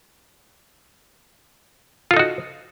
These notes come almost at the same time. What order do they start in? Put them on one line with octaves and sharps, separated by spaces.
F4 A4 D#4 F#4